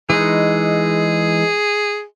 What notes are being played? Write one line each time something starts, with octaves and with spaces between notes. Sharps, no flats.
E3 G#3 D#4 G#4